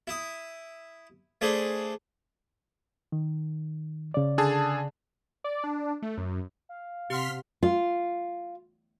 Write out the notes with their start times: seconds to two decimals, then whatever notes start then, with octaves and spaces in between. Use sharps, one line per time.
0.07 E4 D#6
1.41 A3 D4 G#4 C5
3.12 D#3
4.14 C#3 D5
4.38 D3 G#4 A5
5.44 D5
5.64 D4
6.02 A3
6.17 F#2
6.69 F5
7.10 C3 G4 F#5 C6 F6 B6
7.63 F4